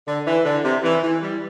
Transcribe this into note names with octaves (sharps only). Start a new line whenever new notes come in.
D3
E3
D3
C3
E3
E3
G3